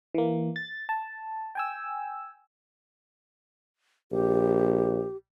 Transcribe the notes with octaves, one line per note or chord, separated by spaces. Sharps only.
E3 A#3
A6
A5
G5 G#5 E6
A#1 G4